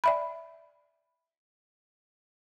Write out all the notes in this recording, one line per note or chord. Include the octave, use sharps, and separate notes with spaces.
D5 E5 B5